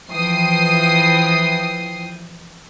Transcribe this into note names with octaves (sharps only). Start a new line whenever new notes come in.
E3 F3 G5 D#6 C7